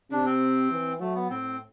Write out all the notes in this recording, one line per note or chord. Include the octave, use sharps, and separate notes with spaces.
C3 D4
C4
E3
F#3 A3
B3
A2 C4